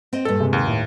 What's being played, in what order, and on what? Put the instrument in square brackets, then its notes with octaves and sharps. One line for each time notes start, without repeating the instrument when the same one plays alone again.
[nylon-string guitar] C4 D#5
[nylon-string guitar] G2 A#2 [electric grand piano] A4
[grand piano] C3 G#3
[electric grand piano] D#2
[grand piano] A2